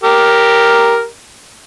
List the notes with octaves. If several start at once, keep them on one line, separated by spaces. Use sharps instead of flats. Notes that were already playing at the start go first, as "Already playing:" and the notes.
G4 A#4